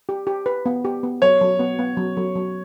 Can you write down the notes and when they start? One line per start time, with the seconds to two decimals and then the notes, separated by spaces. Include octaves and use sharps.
0.09 G4
0.27 G4
0.46 B4
0.66 B3
0.85 G4
1.03 B3
1.22 F#3 C#5
1.41 F#3
1.59 B3
1.79 B3
1.97 F#3
2.17 F#3
2.35 F#3